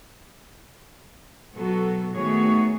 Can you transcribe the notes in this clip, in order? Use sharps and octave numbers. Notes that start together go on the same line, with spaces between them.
B2 F#3 B3 F#4 A4
D#3 A3 B3 F#4 G#4 C#5